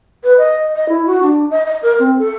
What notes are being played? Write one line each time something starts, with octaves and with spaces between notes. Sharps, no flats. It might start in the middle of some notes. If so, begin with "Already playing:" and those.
B4
D#5
D#5
E4
F#4
D4
D#5
D#5
A#4
C4
A4